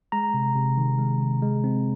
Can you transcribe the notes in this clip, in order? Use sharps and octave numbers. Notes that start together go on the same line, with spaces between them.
G#3 A#5
C3
C3
D#3
G#3
C3
G#3
C4